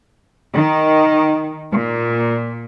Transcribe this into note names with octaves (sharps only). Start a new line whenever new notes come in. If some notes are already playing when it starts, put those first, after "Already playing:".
D#3
A#2